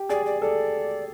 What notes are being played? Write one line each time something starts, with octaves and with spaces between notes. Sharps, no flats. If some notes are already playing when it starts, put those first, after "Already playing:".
Already playing: G4
G#4 D5
D5
A4 D5